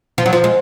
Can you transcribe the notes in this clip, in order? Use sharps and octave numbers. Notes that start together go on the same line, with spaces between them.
F3
F#3
F3
G#3